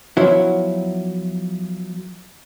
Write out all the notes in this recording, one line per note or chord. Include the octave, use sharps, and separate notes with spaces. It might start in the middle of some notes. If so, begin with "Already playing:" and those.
F3 F#3 B3 E4